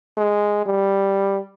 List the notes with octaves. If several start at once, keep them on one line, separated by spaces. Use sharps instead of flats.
G#3
G3